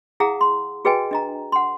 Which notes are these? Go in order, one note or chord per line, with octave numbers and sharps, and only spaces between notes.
E4 G#4 F5 F#5 A#5 D#6
C6
F#4 G#4 B4 D#5 G5 G#5
D4 D#5 A#5
F#5 C6